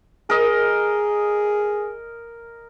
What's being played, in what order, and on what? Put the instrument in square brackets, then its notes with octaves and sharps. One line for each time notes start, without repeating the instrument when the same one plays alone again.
[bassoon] G#4 [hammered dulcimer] A#4 D#5